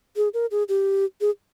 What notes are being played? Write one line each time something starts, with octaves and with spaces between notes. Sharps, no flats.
G#4
A#4
G#4
G4
G#4